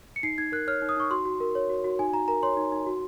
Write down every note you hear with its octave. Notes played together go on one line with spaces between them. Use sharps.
C#7
D#4 C7
D#4 G#6
A#4 F#6
C#5 F6
D#4
D#6
D#4 C#6
F#4 C6
F#4
A#4
C#5
F#4
F#4
D#4 G#5
D#4 A#5
A#4 A#5
C#5 C6
D#4
D#4
F#4